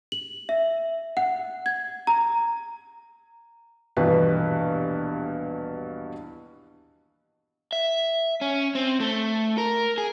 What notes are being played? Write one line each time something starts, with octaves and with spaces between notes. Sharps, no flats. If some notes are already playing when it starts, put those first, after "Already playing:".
F#7
E5
F#5
G#6
A#5
D#1 G2 B2 E3 B3 B4
E5
C#4
C4
A3
A#4
G#4